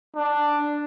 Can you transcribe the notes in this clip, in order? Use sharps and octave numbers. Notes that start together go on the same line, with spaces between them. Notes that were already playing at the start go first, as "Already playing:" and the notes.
D4